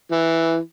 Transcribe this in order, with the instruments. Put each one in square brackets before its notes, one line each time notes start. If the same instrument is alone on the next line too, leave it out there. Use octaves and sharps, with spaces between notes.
[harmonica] E3